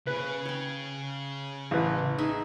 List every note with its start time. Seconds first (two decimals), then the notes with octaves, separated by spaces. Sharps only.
0.07 C#3 G#4 B4
0.45 C#5 G5
1.71 A1 B4
2.18 D#4 G#4 E5